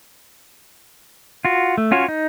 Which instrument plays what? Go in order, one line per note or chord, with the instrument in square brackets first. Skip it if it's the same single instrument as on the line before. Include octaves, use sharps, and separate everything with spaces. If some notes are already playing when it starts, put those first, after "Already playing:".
[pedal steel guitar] F4 F#4
A3
C#4 F4 F#4 C#5
D#4